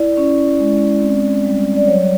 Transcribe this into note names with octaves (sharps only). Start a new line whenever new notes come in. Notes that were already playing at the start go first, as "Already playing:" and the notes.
Already playing: E4 D5
C#4
G#3
C4
G3
D5
F#3 C#5